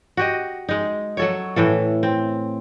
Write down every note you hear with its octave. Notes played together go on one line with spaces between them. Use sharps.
F#4 G4 D#5
G#3 D#4
F#3 A4 C#5
A2 E3 A4
C4